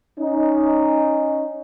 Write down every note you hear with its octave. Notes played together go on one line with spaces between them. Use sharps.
C#4 D#4